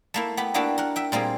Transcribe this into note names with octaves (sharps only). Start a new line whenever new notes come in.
A3 A#3 E4
B3 G4 B5
A#3 B3 D4 E4 F#4 G4
A#4 F#5
E5 G5
A#2 G3 A#3 C4 G#4